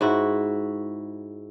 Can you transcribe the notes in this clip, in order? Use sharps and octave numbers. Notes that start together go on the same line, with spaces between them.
G#2 E4 F#4